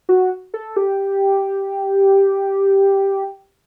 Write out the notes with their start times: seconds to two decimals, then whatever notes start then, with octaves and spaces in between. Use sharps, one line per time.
0.09 F#4
0.54 A4
0.76 G4